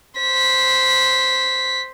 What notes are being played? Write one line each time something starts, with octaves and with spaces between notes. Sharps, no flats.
C5 B6